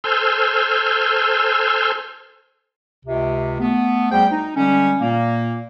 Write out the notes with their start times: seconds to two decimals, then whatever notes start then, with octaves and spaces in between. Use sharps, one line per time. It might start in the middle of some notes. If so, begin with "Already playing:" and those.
0.04 A4 C5 G#5 E6 F6 G6
3.05 C#2 C3
3.59 A3 B3
4.12 D2 G3 G#4 C5 G5
4.31 D#4
4.56 D3 G3 G#3 C#4
5.01 A#2 A#3